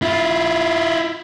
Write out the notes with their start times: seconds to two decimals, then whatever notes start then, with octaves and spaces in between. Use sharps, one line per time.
0.02 E4 F4